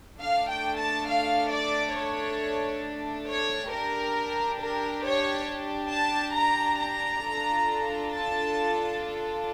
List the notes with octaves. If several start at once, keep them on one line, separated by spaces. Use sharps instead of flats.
A3 D4 A4 F5
G5
A5
F5
D5
C#5
C#5
D4 G4 A#4
A#4
C#5
A5
A#5
A#5
D4 F4 A4
A5